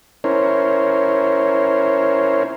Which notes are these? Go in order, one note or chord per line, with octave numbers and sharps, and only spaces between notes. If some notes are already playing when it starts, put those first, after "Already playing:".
C#4 E4 A#4 C5 C#5